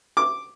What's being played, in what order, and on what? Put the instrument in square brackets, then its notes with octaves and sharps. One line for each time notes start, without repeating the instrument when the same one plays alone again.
[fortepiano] D6